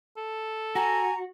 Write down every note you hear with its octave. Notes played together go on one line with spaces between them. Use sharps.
A4
F#4 G#5 A#5